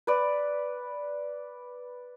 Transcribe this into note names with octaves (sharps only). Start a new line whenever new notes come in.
B4 D5